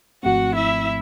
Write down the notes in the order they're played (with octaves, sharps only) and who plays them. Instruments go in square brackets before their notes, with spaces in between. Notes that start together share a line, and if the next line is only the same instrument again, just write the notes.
[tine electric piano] G#1 G#2 F3 A3 C4 [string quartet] F#4 F#5
[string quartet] E4 E5